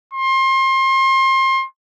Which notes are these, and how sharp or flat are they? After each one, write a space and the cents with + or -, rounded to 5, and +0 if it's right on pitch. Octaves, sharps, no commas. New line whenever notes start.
C6 +30